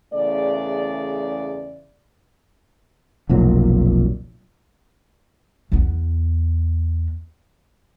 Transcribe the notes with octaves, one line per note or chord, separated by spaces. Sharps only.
E2 C#3 A3 D5
F1 B1 A#2 F#3
E2 B3